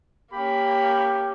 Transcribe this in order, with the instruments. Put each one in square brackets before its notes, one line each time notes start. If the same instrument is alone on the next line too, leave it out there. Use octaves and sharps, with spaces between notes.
[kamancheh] A#3 C#4 [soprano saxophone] G4 [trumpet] B5